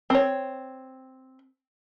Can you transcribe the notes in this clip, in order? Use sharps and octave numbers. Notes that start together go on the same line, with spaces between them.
C4 C#5